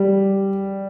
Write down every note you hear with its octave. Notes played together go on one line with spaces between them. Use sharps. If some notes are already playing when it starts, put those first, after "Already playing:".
Already playing: G3